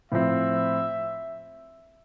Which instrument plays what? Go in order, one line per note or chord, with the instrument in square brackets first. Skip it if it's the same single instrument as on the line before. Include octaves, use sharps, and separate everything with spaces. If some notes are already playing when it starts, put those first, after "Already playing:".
[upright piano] A2 F3 C4 [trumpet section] E5